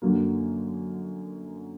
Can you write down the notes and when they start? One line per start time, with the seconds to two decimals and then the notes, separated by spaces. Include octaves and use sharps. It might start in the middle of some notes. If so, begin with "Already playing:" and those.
0.02 F#2 D3 F#3 A#3